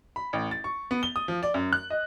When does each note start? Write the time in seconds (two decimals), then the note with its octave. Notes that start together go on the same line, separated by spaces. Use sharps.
0.16 B5
0.33 A1
0.51 A6
0.64 C#6
0.91 B3
1.03 G7
1.16 D#6
1.28 F3
1.43 D5
1.54 F#2
1.73 F#6
1.90 D#5